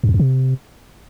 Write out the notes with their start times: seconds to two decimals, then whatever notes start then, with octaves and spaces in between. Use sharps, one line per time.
0.04 F#2
0.09 E2
0.14 F2
0.19 C3